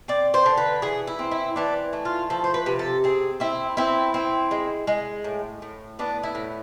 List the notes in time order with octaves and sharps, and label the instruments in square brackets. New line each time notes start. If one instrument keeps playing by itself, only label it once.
[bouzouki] C4 D5
C5
D3
B4
E3 G#4
E4
C4
E4
E3 D4
A3
F4
F3 A4
C5
B4
C3
A4
C4 G#4
C4 E4
C4 E4
C4
G#3
G#3
A2
A2
B3 D4
E4
A2